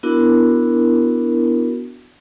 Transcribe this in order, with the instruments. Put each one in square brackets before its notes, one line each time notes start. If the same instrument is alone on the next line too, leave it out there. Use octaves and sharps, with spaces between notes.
[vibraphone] B3 D4 E4 F#4 A#4